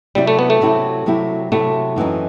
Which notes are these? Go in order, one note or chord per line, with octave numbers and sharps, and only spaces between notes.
C3 F#3 G3 C4 E4 G4
A3
B3
A3
C3 F#3 C4 E4 G4
C3 F#3 C4 E4 G4
C3 F#3 A3 C4 E4 G4
F#2 E3 G3 C4 D#4